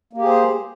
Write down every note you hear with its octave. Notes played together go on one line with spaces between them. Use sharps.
A#3 G4 G#4 C5